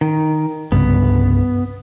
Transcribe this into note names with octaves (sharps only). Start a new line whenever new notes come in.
D#3
C2 G2 C#3 B3